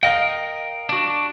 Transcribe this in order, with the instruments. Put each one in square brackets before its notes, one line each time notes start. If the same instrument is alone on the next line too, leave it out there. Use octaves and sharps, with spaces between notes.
[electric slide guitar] A#4 D#5 G5 [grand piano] F5
[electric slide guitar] D4 F#4